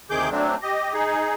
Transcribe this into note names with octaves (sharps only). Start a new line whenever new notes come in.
D2 C3 D#3 G#4 D6 G6
F#3 A3 C4 D4
G4 D#5
D#4 G#4